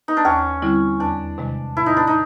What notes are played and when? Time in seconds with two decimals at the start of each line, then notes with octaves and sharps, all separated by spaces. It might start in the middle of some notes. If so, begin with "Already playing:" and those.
0.08 D#4
0.17 D4
0.25 D#2 C#4
0.62 D3 G3 C4 E4
1.00 E2 D4
1.38 C3 D#3 G#3
1.76 A2 E4
1.86 D#4
1.97 D4
2.07 D#4